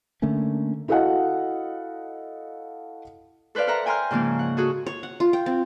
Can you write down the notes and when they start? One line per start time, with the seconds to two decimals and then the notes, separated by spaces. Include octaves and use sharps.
0.22 D3 A3 A#3 C#4
0.88 E4 F#4 A4 D#5 F5 F#5
3.55 A4 B4 C5 D5 F5
3.67 A4 A#4 E5 F#5 A#5
3.86 G5 G#5 A#5 C6 F6 G6
4.11 G#2 C#3 F3 A#3 C#4
4.39 F#5
4.57 F#4 G#4 A4
4.86 C#5
5.03 F#5
5.20 F4
5.33 G5
5.46 C4